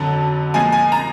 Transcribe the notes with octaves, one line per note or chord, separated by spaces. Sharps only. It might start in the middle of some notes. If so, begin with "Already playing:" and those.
Already playing: F2 D3 F#3 A5
A#2 F3 G#3 G#5
G#5
A#5